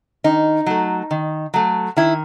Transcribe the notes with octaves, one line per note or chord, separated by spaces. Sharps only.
D#3 D#4
F#3 A3
D#3
F#3 A3
D#3 E4